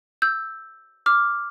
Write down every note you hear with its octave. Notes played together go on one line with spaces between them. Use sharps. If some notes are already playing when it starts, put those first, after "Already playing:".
E6 G6
D6 F6